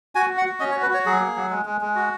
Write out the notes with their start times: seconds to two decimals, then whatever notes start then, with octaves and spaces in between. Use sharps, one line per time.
0.15 F#4 G#5
0.30 F#4
0.38 F#5
0.45 F#4
0.60 C#4 D#5
0.72 C#5
0.75 F#4
0.82 B4
0.90 F#4 C#5
1.06 F#3 G#4
1.20 A#3
1.36 F#3
1.50 G#3
1.65 G#3
1.81 G#3
1.95 F#4